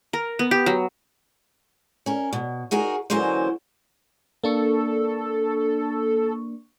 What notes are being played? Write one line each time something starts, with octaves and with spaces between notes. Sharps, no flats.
A#4
B3
G4
F#3
C#4 A#4
B2
D#4 F#4 G#4 A#4
D3 E3 F#3 A#3 C#4 C5
A#3 D4 A4 C#6